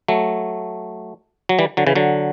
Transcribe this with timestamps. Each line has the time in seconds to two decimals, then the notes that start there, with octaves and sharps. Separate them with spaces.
0.08 F#3 A3
1.49 F#3
1.59 E3 G3
1.77 D3 F#3
1.87 C#3 E3
1.95 D3 F#3